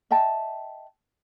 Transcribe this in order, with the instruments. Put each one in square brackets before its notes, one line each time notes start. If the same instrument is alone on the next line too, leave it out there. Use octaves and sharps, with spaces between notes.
[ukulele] D#5 E5 G5 A5